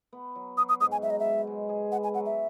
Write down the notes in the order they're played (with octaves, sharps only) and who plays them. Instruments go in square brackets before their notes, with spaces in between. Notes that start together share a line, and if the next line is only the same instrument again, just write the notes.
[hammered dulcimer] B3
F#3
[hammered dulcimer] F#3 [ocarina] D#6
[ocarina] D#6
[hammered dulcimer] G#2 [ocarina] D#6
[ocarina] G#5
[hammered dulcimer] F#3 [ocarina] E5
[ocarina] D#5
E5
[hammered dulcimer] B2
G#3
G#4
[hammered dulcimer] B3 [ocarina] F#5
[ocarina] G#5
[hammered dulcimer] F#3 [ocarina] F#5
[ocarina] E5